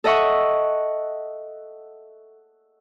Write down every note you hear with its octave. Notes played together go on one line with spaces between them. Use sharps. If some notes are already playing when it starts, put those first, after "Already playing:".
A4 D#5 E5 F#5 C#6